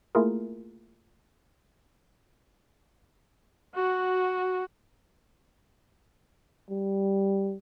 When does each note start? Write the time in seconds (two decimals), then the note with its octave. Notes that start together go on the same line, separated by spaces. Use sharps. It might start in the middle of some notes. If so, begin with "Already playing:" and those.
0.15 A3 A#3 E4 F4 G#4 A#4
3.77 F#4
6.70 G3